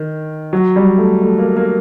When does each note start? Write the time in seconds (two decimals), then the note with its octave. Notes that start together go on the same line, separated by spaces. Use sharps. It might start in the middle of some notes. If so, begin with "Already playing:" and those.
Already playing: D#3
0.53 F#3
0.76 G3
0.98 A3
1.22 A3
1.39 A#3
1.56 A#3